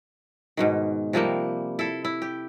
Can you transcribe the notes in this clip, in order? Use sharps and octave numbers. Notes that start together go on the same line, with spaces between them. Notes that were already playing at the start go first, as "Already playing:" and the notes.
G#2 B2 D#3
C3 F3 G3 A#3
E4 A4
E4
G4